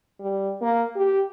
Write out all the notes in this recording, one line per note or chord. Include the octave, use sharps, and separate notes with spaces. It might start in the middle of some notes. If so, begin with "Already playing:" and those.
G3
A#3
G4